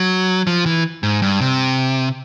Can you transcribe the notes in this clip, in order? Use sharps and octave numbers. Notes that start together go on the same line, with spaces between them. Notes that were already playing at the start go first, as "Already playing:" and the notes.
Already playing: F#3
F3
E3
G#2
G2
C3